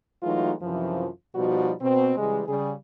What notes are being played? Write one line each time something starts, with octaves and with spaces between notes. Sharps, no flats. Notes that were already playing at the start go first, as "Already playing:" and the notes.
E3 F#3 G#3 A3 D#4 F4
F#2 C3 E3 F3
B2 F3 G3 D#4 F#4
B2 C4
C#3 E3 G3 G#3
C#3 G3 G#4